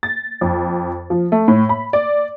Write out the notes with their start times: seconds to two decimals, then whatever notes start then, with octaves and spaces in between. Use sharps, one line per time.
0.03 A6
0.41 F2
1.10 F3
1.32 A3
1.48 A2
1.69 B5
1.93 D5